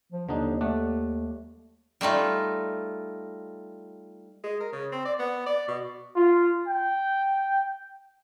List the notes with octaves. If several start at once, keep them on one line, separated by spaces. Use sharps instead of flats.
F3
D#2 D3 D4 D#4
A3 D5 F#5
G3 A3 D#4 F4
G#3
A#4
C#3
C4
D5
B3
D5
B2
F4
G5